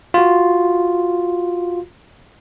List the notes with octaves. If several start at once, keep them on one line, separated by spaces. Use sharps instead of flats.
F4 F#4